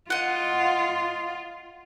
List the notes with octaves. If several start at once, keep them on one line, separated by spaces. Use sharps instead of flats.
F4 D#5 F#5